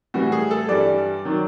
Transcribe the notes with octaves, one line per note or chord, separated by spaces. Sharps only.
A2 E3 G3 F#4
G#4
A4
G2 E3 G3 D5
D#3 F#3